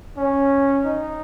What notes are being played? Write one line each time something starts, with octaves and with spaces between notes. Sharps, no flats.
C#4
D#4